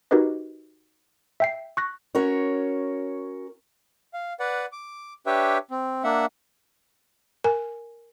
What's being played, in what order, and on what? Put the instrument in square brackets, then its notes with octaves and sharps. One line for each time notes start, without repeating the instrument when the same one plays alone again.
[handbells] D#4 F#4 G4 A#4 B4 D#5
E5 G5 C7
C#6 F#6 A#6
[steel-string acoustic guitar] C#4 F#4 A#4 C#5
[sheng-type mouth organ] F5
B4 D5 F#5
D6
D4 G4 B4 C#5 E5 G5
C4
A#3 D4 E5 F#5
[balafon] A#4 G#5